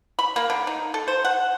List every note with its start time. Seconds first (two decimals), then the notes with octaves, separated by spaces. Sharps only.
0.19 B5
0.36 A#3
0.50 D3
0.67 D#4
0.94 A4
1.08 C5
1.24 F#5